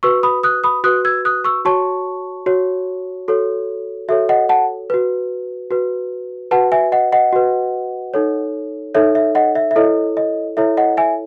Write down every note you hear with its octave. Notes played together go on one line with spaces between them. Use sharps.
F#4 B4 C#6 E6
B5 D#6
D#6 F#6
B5 D#6
F#4 B4 D#6 F#6
E6 G#6
D#6 F#6
C#6 E6
F#4 C#5 A5 C#6
F#4 C#5
F#4 A4 C#5
F#4 A4 C#5 E5
D#5 F#5
F#5 A5
F#4 B4
F#4 B4
F#4 B4 F#5 A5
E5 G#5
D#5 F#5
D#5 F#5
F#4 B4
D#4 A4 C#5
D#4 A4 C#5 E5
E5
D#5 F#5
E5
E5
E4 A4 C#5 D#5
D#5
E4 A4 C#5 E5
D#5 F#5
E5 G#5